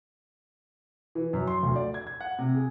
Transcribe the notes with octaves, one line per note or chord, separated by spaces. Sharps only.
E3
F#2
C6
D2
D5
G#6
G#6
F#5
C3
G#4